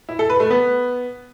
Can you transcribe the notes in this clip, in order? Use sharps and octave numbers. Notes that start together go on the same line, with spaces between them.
E4
A4
B4
A3
B3